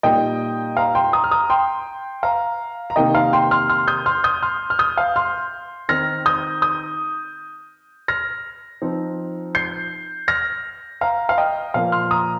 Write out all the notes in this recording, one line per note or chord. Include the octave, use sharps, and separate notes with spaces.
A#2 G3 A#3 D#4 D#5 G5
F5 A#5
G5 C6
A#5 D#6
F6
A#5 D#6
G5 C6
F5 A#5
A#5
C3 D#3 A#3 D#4 D#5 G5
F5 A#5
G5 C6
C6 F6
C6 F6
D#6 G6
C6 F6
D#6 G6
C6 F6
F6
D#6 G6
F5
C6 F6
D#3 C4 D#4 F6 A#6
D#6 G6
D#6 G6
F6 A#6
F3 C4 D#4
G6 C7
F6 A#6
F5 A#5
F5
D#5 G5
A#2 F3 A#3 F5
C6 F6
A#5 D#6